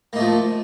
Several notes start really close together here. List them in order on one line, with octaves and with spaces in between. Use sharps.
A#3 D#4 A3 F3